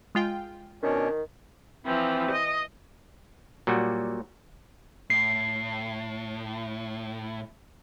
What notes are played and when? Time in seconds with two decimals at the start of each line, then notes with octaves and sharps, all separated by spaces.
0.15 G#3 F4 G5
0.83 B2 D#3 C#4 D4
1.85 E3 F3 C4
2.31 D#5
3.67 A#2 F#3 G3 F#4
5.10 A2 C7